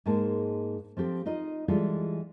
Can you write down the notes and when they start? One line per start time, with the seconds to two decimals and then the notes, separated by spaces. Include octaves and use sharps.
0.06 G#2 G#3 A#3 A5
0.97 F3 C4 G4 A4
1.26 D#4 F4 D#5
1.68 E3 G3 G#3 F4 A4